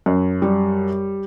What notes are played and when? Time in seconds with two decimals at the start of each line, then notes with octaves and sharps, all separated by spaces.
0.06 F#2
0.42 G3